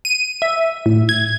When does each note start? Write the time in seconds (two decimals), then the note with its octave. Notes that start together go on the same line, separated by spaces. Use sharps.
0.05 D#7
0.42 E5
0.86 A2
1.09 G#6